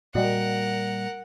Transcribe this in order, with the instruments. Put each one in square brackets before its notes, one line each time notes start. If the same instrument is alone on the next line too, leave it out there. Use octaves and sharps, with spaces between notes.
[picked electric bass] A#2 G3 [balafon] F#4 D5 D#5 [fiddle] A#4 F#5